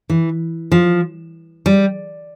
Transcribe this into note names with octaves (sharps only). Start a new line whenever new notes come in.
E3
F3
G3